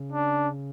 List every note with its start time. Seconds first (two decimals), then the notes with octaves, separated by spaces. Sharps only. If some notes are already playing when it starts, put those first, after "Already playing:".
Already playing: C#3
0.12 D4